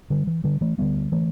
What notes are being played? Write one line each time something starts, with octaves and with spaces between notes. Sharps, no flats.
D3 G3
E3
D3 G3
E3 A3
D2 D3 G3 B3
E3 A3